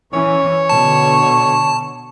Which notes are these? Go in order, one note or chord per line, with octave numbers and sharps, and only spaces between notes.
E3 C#4 C#5
B2 D3 A5